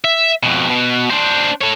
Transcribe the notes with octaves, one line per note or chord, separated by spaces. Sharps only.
E5
F2 B2
B2
D4 C5
A4 C#5